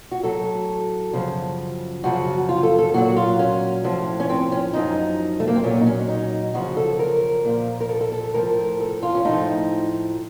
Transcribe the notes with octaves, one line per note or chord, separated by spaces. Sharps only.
F#4
A2 F#3 A4
F#2 C#3 F3
F#2 C#3 F3 F#4
F4
A4
A4
A#2 F#3 F#4
F4
C#4
A2 F3
C#4
C4
C#4
F#2 F3 D#4
A3
A#3
C4
A#2 F#3 C#4
D#4
C#4
D#4
F#2 C#3 F3 F#4
A4
A#4
A#2 F3
A#4
A4
A4
A4
A4
A2 F3 A#4
A4
F4
C#4
A2 F3 D#4